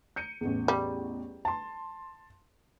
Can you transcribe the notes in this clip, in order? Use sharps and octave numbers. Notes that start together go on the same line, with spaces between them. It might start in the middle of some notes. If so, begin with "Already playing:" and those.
G6 C#7 D#7
A1 E2
G3
A5 C6